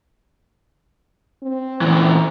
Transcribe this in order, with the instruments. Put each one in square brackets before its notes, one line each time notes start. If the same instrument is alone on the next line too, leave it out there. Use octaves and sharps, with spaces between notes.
[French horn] C4
[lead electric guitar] A#2 E3